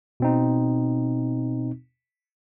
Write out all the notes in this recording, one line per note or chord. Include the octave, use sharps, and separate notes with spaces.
B2 C4 D#4